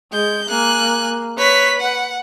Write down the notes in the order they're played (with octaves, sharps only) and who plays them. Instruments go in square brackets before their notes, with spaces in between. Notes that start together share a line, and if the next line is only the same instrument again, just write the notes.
[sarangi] G#3 [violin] G6
[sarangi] A#3 [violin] G#5 F#6
[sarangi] B4 [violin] C#5 B6
[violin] F#5